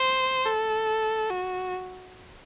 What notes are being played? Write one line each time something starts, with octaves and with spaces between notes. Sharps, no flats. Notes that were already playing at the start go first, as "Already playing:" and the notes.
Already playing: C5
A4
F#4